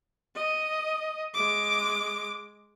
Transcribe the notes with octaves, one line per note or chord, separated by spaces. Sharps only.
D#5
G#3 D6